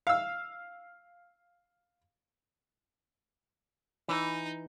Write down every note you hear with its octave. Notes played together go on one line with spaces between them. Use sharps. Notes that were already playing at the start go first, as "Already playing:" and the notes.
F5 E6
E3 D#4